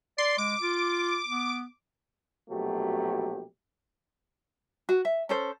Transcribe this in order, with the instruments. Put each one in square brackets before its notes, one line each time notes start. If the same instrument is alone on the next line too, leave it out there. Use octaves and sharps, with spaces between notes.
[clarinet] D5 [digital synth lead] C6
[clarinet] G#3 [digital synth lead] D6
[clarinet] F4
B3
[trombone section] A#1 B2 F#3 A3 G4
[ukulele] F#4
E5
C#4 A4 C5